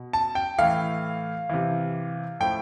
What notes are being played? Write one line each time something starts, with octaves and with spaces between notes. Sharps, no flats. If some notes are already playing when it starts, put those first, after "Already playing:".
Already playing: B2
A5
G5
A2 E3 F5
C3 E3
A2 F3 G5